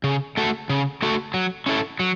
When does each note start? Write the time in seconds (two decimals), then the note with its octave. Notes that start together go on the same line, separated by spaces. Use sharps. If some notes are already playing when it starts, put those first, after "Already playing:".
0.04 C#3
0.37 A3 F#4 A4
0.69 C#3
1.02 A3 F#4 A4
1.34 F#3
1.66 C#4 E4 A4
1.99 F#3